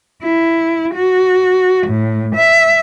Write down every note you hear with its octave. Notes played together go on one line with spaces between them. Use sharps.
E4
F#4
A2
E5